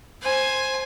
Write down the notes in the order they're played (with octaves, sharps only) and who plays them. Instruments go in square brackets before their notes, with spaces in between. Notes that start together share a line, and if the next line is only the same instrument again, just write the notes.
[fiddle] C5 G#5